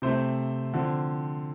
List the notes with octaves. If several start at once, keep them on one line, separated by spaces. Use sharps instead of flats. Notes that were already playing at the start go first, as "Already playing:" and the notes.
C3 A3 C4 C5
D3 F3 C4